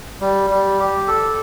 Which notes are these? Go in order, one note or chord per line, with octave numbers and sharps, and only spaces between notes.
G3
G3
G4
A4